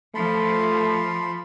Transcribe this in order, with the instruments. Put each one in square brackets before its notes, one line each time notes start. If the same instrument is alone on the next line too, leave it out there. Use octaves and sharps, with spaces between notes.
[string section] F3 [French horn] A3 [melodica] A5 B5 C6